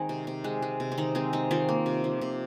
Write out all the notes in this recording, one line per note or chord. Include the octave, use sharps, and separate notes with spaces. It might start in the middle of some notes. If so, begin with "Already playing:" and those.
Already playing: D#3 G#3 C4 D#4 G#4
C3
C3
G#3
G#3
C3
C4
D#3 D#4
G#3 C4
G#3 D#4
D#3 C4 F4
A#3
C3
F3
C3